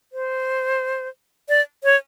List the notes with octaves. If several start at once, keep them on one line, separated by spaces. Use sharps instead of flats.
C5
D5
C#5